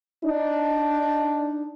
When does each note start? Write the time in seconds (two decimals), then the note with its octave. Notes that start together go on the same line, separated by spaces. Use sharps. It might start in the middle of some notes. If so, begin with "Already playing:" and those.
0.25 D4 D#4